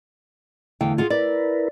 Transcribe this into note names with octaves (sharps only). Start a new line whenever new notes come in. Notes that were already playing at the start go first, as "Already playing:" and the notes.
E2 D3 A3 E4 F5 G5
F4 F#4 G#4
E4 A#4 B4 D5